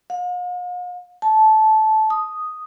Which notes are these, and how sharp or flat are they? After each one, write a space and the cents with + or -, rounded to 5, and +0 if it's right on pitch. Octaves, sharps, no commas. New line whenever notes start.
F5 +45
A5 -15
D#6 +0